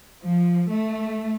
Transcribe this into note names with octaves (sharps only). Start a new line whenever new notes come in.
F3
A3